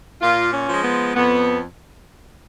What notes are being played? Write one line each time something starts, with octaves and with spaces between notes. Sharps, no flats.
A#2 F4
C#4
F3 G#3
B3
F2 B3